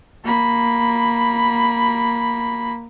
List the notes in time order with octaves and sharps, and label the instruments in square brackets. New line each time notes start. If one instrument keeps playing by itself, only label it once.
[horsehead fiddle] A#3 B5